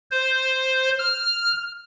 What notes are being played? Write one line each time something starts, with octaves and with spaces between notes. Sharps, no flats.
C5
F6